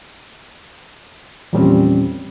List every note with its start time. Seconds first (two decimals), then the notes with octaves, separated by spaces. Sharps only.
1.53 E2 A#2 F3 G3 C4 C#4